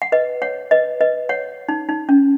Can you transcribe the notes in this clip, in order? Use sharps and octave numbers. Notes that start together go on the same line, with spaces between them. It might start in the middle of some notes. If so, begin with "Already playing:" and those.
F#5
B4 D#5
C#5 F#5
B4 D#5
B4 D#5
C#5 F#5
D#4
D#4
C#4